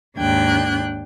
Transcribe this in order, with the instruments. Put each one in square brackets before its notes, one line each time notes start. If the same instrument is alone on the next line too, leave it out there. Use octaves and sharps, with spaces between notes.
[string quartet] D#2 G#2 D4 G5 F#6 G#6